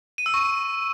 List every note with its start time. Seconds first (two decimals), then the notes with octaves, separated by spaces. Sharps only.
0.18 D#7
0.26 E6
0.34 C#6